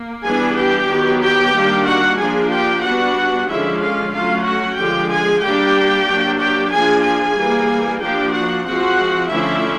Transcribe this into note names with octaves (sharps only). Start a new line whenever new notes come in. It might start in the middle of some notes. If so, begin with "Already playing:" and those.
Already playing: A#3
E3 G3 B3 D4 G#4 G#5
G4 G5
D#3 F#3 B3
G4 G5
D#3 G3 A#3 D4
F#4 F#5
F3 A#3 D4 G#4 G#5
G4 G5
G3 B3 D4 F#4 F#5
D3 F3 G#3 C#4 E4 E5
F4 F5
F#3 A3 C#4 F4 F5
F#4 F#5
D3 F3 G#3 G4 G5
G#4 G#5
G3 A#3 D4 G4 G5
F#3 A#3 D4
G4 G5
F3 A#3 D4 G#4 G#5
G#4 G#5
E3 G3 A#3
F3 A#3 D4 G4 G5
F#4 F#5
F3 G#3 C4 F#4 F#5
D3 F3 A3 C#4 E4 E5